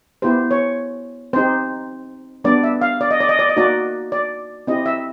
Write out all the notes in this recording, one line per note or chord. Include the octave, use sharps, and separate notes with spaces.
B3 E4 G4 C5
C#5
C4 D#4 G4 C5
G3 B3 D4 D5
E5
F5
D5
D#5
D5
D#5
D5
D#5
A#3 D#4 F#4 D5
D5
C4 E4 G4 D#5
E5